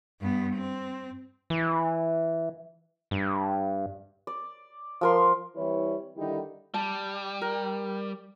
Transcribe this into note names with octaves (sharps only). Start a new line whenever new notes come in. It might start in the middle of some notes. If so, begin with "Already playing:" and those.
G2 B3
C4
E3
G2
D5
F3 A#4 C6
E3 G3 C4 E4 B4 C#5
D3 D#3 G3 D#4 E4 G4
G3 A5
A#4